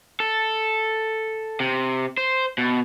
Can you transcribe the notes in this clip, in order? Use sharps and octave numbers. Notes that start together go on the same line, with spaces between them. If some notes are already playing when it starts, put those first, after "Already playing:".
A4
C3
C5
B2